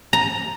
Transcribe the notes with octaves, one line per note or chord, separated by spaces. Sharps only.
A#5